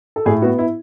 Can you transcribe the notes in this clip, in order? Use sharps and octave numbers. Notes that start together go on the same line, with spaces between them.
A4
A2 G#4
B3 F#4
E4